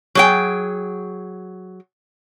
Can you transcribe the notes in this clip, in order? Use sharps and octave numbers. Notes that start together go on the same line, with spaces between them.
F#3 G#4 G5